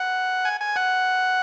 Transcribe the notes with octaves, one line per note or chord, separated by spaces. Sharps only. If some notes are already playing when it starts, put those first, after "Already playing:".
Already playing: F#5
G#5
G#5
F#5